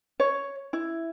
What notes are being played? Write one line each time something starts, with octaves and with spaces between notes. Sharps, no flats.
C#5
E4